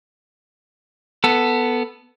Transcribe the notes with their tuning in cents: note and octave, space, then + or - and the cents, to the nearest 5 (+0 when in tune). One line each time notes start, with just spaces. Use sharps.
B3 +0 A4 +10